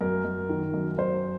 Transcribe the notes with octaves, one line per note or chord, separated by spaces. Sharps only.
F#2 A#4
F#2
D#3
F#2
F#2 C5